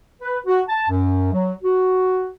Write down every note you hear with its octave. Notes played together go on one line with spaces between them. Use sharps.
B4
F#4
A5
F#2
F#3
F#4